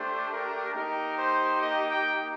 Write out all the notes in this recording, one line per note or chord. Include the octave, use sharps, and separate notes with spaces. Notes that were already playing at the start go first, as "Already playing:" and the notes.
Already playing: A3 D4 G4 C5
A#4
A#3 D#4 G4 A#4
C5
D#5
G5